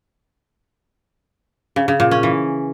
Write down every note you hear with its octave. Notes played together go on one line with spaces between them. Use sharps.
C#3
C#3
A#2
C#4
E3